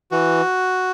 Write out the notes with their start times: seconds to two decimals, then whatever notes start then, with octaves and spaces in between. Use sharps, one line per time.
0.11 E3 F#4